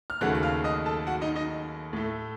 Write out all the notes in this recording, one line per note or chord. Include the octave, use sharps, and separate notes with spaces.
F6
D#2 C#3 F#3 A3 F#5 F#6
F#6
F5 F6
D#5 D#6
A4 A5
F#4 F#5
D#4 D#5
D#4 D#5
A2 A3